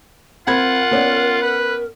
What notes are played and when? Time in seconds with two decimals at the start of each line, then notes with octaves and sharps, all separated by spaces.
0.47 C4 F4 A#4 F#5 B5 G#6
0.91 B3 C#4 D5
1.42 B4